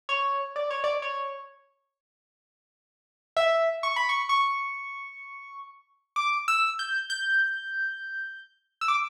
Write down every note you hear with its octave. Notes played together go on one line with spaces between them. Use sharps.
C#5
D5
C#5
D5
C#5
E5
C#6
B5
C#6
C#6
D6
E6
G6
G6
E6
D6